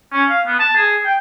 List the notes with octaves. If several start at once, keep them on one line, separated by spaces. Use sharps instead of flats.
C#4
F5
B3
A5
G#4
G5